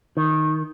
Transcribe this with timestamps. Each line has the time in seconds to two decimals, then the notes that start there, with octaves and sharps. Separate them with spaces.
0.17 D#3